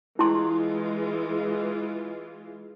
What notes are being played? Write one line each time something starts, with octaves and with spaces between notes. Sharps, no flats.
E3 G#3 E4 F4 C6